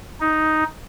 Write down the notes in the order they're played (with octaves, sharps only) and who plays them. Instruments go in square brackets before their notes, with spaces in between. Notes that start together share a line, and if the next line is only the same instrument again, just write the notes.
[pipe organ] D#4